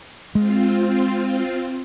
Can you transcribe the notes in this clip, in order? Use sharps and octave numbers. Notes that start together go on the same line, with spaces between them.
G#3 C4 F4